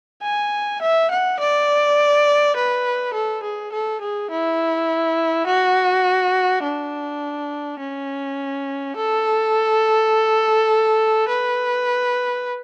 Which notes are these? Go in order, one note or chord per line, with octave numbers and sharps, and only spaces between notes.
G#5
E5
F#5
D5
B4
A4
G#4
A4
G#4
E4
F#4
D4
C#4
A4
B4